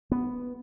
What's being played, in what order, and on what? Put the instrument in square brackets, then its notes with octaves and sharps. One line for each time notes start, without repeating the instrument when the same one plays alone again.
[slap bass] B3